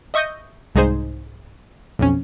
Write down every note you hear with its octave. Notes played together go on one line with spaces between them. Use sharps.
D#5 E5 C#6 D#6 G6 A#6
C2 G#2 D#4 G#4 C5
B1 F2 C#4